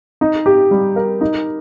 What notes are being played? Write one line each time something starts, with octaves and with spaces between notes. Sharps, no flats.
D#4
G4
G3
A#4
D#4